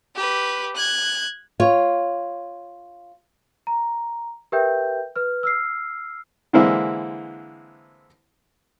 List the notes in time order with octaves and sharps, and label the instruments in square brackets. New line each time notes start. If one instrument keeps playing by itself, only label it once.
[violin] G4 B4
F#6 G#6
[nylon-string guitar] F4 C#5
[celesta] A#5
G4 A#4 B4 E5 G5 G6
B4 F6
E6 F6 C7
[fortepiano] D3 E3 G#3 A#3 C4 E4